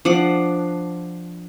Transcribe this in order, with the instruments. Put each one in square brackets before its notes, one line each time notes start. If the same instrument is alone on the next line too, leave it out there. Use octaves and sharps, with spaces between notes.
[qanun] F3 D4 F#5 D6